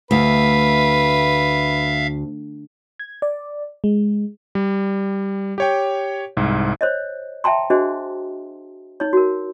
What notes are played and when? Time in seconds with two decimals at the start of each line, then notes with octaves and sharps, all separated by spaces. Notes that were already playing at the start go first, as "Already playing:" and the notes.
0.11 D2 B4 E5 F5
3.00 G#6
3.22 D5
3.84 G#3
4.55 G3
5.58 G4 C#5 G5
6.37 C2 G#2
6.81 C5 C#5 D#5
7.44 E5 G5 A5 A#5 C6
7.70 D4 F#4 G#4 C5 D#5
9.00 D#4 C#5
9.13 F#4 A#4